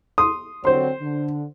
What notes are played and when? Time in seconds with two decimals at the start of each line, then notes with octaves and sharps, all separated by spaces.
0.18 C6 D#6
0.65 D3 F#3 C4 C5 C6
1.01 D3